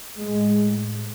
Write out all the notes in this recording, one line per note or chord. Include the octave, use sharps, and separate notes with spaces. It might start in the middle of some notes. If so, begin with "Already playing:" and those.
A2 G#3